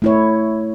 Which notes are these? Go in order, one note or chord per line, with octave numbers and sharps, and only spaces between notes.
A3 E4 C#5